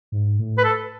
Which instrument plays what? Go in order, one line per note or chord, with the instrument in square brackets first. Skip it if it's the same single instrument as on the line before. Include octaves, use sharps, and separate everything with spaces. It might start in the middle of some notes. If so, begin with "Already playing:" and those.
[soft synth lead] G#2
A2
[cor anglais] B4
A4